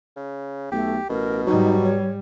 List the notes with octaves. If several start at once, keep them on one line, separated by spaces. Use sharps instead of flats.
C#3
B1 A3 G4
A1 B2 A#4
G#2 F#3 G3 D#4
C#5